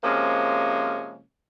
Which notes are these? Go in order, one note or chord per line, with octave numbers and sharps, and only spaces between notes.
C3 F3 G#3 A#3 C#4